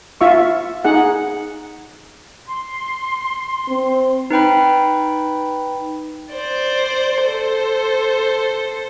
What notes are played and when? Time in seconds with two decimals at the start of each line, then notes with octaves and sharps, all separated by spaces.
0.21 F4 E5 C#6
0.85 D#4 G#4 F#5
2.49 C6
3.69 C4
4.31 D#4 B4 G5 B5
6.34 C5 D5
7.24 A4 C5